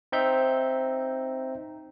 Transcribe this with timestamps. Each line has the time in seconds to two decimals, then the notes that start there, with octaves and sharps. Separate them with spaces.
0.12 C4 D#4 E5 G6